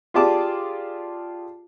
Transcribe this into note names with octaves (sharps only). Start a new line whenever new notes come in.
F4 G4 G#4 D5 A5 D6